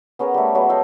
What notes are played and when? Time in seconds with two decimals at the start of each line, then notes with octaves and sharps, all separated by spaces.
0.19 B3 C#4 G#4 A#4
0.34 G3 A3
0.55 F#3 G#3 B3
0.69 A4 D#5 F5 G5